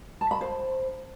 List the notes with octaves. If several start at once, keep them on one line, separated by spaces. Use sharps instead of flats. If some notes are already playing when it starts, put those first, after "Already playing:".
A5
B5
C5